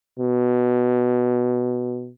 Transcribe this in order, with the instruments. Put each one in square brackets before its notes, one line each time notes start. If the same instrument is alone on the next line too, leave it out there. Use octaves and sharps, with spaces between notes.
[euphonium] B2